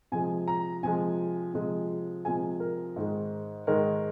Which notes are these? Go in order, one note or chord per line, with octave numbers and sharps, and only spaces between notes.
C3 F3 G#3 G#5
A#5
C3 F3 G#3 G#5
C3 F3 G#3
C3 F3 G#3 G#5
A#4
G#2 D#3 G#3
G#2 D#3 G#3 A#4